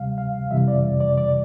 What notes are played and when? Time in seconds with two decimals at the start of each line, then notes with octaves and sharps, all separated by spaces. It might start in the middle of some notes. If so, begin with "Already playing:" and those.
Already playing: D2 C3 G3 F5
0.18 F5
0.51 F2 C3 E3 G3 E5
0.68 D5
1.00 D5
1.17 D5